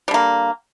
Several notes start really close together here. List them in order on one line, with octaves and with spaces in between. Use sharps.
G3 D3 A#3